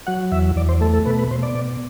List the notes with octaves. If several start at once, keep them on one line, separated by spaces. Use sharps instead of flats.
F#3 F#5
E2 E5
E2 D5
C5
A3 A4
A4
B2 B4
B4
B2 C5
D5
B2